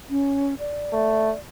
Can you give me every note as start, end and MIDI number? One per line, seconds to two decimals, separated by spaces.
0.10 0.54 61
0.59 1.39 74
0.93 1.30 57